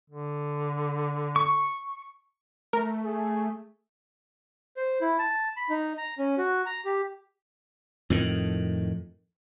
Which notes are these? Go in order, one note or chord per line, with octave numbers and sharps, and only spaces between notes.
D3
C#6
A3 A#4
G#4
C5
E4
A5
B5
D#4
A#5
C#4
F#4
A#5
G4
F2 A2 D#3